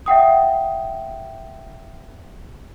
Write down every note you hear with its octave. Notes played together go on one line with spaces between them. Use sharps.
E5 F#5 G5 D#6